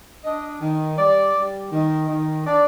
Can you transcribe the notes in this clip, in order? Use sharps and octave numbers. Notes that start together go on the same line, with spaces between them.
D4 D#5
D#3
G3 D5
G3
D#3
D#3
D4 D5